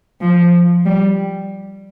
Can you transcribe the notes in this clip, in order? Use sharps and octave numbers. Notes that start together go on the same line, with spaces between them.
F3
G3